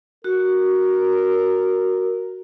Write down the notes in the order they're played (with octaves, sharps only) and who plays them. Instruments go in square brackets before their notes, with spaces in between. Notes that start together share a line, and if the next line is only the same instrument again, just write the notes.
[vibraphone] F#4 [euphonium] A#4